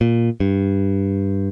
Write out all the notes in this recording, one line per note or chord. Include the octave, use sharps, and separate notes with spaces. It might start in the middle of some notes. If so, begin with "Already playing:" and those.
A#2
G2